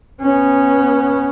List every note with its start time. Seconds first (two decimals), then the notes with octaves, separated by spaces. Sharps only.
0.21 B3 C#4